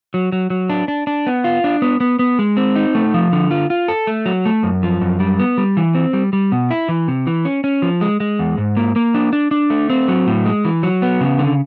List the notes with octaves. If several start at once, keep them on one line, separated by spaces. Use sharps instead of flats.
F#3
F#3
F#3
D4
D4
D4
B3
F4
D4
B3
B3
B3
G#3
C4
D#4
A3
F3
D3
F4
F4
A4
A3
F#3
A3
F#2
F3
F#2
G3
B3
G3
E3
C4
G3
G3
B2
E4
E3
C3
E3
C#4
C#4
F3
G#3
G#3
E2
G#2
A#3
A#3
D4
D4
D4
A3
C4
F#3
A2
G#3
E3
F#3
B3
C#3
D3